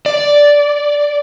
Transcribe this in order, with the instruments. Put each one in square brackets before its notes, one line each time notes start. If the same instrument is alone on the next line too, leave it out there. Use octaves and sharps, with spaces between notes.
[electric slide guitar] D5